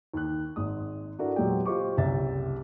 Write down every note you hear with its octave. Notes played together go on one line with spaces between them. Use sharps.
D#2 F#6
G#1 G#3 D#6
D4 E4 F#4 A4 A#4 D5
E2 A#2 F#3 G#3 G4 G5
F4 G4 C5 D#5 C#6 D6
F#1 C2 G4 E5 A6